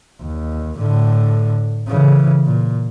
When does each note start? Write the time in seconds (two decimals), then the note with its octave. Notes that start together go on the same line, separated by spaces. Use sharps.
0.21 D#2
0.78 A2 D3
1.88 C#3 E3
2.46 A#2